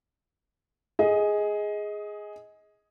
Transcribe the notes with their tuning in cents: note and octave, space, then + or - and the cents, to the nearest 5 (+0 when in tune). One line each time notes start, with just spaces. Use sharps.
G#4 +0 D#5 +20